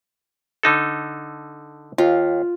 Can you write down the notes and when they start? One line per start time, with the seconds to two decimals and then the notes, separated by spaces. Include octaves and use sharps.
0.63 D3 D#4 A4
1.98 D#2 F4